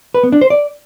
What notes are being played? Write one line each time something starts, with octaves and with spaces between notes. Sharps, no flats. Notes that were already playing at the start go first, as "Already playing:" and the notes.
B4
B3
D4
C5
D5